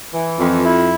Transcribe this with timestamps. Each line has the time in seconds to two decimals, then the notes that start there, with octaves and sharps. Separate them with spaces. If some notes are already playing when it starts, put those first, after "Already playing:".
0.13 E3
0.39 F2
0.65 E4